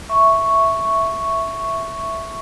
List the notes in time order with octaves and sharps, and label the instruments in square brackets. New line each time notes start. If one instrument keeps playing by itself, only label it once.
[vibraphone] E5 C#6